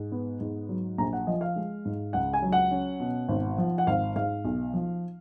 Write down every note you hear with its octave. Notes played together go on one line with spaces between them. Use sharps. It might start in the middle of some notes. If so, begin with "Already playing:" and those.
Already playing: G#2
B3
G#2
F#3
A#1 A#5
F#5
F3 D#5
F5
G#3
G#2
C#2 F#5
G#5
F#3
F#5
C#4
B2
G#1
F3
F#5
G#1 F5
G#2 F5
B1
F3